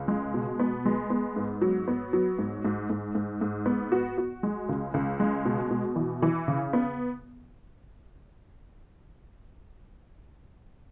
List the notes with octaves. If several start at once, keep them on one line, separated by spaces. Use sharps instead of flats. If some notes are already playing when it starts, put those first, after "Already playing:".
Already playing: C#2
G#3
B2
B3
G#3
B3
G#2
F#3
B3
F#3
G#2
G#2
G#2
G#2
G#2
B3
F#4
F#4
G#3
C#2
C#2
G#3
B2
B2
E3
E3
C#3
B3